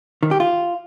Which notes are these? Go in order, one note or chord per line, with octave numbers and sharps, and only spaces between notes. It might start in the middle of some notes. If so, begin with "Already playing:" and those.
D#3
G4
F4